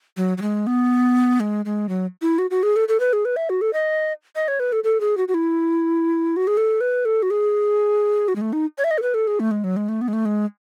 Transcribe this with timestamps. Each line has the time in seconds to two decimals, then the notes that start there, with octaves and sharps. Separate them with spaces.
0.17 F#3
0.38 F#3
0.42 G#3
0.67 B3
1.40 G#3
1.65 G#3
1.89 F#3
2.22 E4
2.38 F#4
2.51 F#4
2.63 G#4
2.76 A4
2.88 A4
3.00 B4
3.13 G#4
3.25 B4
3.36 E5
3.50 F#4
3.61 A4
3.73 D#5
4.36 D#5
4.48 C#5
4.60 B4
4.72 A4
4.84 A4
5.00 G#4
5.17 F#4
5.28 F#4
5.34 E4
6.36 F#4
6.47 G#4
6.57 A4
6.81 B4
7.05 A4
7.23 F#4
7.30 G#4
8.28 F#4
8.36 G#3
8.41 A3
8.53 D#4
8.78 C#5
8.84 E5
8.91 D#5
8.98 A4
9.02 B4
9.14 A4
9.27 G#4
9.40 A3
9.51 G#3
9.64 F#3
9.76 G#3
9.89 A3
10.01 B3
10.08 G#3
10.13 A3
10.25 G#3